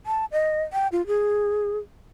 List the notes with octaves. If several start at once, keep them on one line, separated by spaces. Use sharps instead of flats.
A5
D#5
G5
F4
G#4